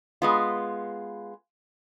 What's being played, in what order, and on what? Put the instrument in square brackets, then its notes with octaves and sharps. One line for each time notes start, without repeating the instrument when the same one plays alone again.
[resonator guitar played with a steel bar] G#3 B3 F4